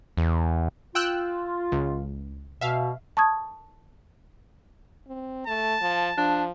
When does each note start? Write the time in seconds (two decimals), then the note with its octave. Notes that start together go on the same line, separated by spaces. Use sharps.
0.17 E2
0.95 F4 G5 E6 F#6
1.72 C#2
2.61 B2 E5 F5
3.17 A5 C#6 D#6 G#6
5.08 C4
5.47 A3 A5
5.81 F3
6.17 F3 D4